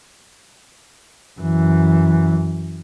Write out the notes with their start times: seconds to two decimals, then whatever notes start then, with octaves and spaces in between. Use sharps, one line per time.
1.40 F#2 E3